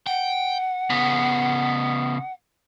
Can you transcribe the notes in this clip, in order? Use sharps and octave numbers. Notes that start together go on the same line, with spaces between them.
F#5 G5
C#3 B3